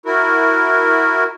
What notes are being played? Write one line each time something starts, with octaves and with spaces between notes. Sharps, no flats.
E4 F#4 A#4